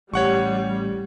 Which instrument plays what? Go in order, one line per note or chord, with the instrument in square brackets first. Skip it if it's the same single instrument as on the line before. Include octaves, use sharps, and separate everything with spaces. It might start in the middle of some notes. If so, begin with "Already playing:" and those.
[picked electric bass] A1 [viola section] G3 [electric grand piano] C#5 F#5 C#6